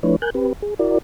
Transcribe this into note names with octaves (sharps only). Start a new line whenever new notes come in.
F3 A3 D4 E4 B4 C#5
A#4 G#5 F#6 G6
C4 G4 B4
G#4
E4 F#4 A#4 D5